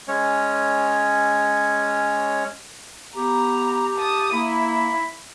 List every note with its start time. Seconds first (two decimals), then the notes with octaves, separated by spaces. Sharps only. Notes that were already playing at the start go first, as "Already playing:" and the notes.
0.08 G#3 C#4 C#5
3.15 B3 G4 A#5
3.98 A5 D#6
4.33 A#3 E4 B5